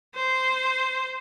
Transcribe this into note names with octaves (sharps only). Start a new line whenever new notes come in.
C5